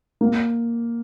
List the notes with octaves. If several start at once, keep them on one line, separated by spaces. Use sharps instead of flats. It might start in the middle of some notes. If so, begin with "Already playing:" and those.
A#3